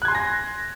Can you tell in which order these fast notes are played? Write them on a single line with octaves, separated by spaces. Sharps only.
F#6 G#6 C6 G#5 A#6